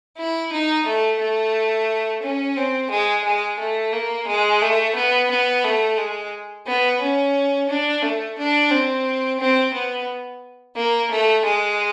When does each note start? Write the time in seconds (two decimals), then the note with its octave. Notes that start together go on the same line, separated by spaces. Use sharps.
0.17 E4
0.52 D#4
0.86 A3
1.19 A3
2.23 C#4
2.57 C4
2.90 G#3
3.25 G#3
3.59 A3
3.93 A#3
4.27 G#3
4.61 A3
4.96 B3
5.30 B3
5.64 A3
5.98 G#3
6.66 B3
7.01 C#4
7.69 D4
8.03 A3
8.38 D4
8.71 C4
9.40 C4
9.73 B3
10.76 A#3
11.11 A3
11.45 G#3